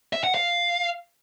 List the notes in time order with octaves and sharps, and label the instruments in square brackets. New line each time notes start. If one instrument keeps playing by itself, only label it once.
[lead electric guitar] E5
F#5
F5